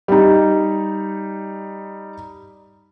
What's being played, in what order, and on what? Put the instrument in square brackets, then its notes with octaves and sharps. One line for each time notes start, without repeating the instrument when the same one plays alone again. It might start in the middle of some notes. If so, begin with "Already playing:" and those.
[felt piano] G3 D#4